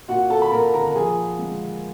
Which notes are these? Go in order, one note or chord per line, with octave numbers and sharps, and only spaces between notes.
A#2 F#4 F#5
A4 A5
B5
A#2 A#4 A#5
A#4 A#5
F3 G#4 G#5
G#3